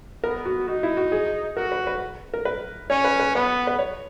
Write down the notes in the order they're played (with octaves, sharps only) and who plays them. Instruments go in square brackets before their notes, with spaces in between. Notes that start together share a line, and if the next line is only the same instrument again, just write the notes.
[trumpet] B3 [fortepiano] A#4
[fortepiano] F#4
[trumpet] D#4 [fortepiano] F#4
[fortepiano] E4
F#4
G#4
[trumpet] F#4 [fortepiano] A#4
[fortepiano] B4
B4
A#4
B4
[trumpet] C#4 [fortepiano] C#5
[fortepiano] B4
B4
[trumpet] B3 [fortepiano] B4
[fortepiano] B4
C#5